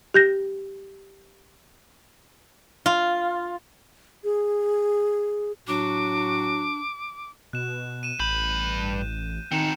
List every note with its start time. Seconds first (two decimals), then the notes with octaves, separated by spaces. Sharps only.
0.14 G4 G6 A#6
2.86 F4
4.24 G#4
5.67 A2 F#3 D4 F#4 D6
7.53 B2 F#6 E7
8.03 D#7 E7
8.20 A1 G2 B5 G6
9.52 D#3 C4 D#4 C#7 E7